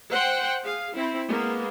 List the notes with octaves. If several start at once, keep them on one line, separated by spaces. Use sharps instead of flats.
C5 F#5 G5
G#4 F5
C4 E4
G#3 A#3 B3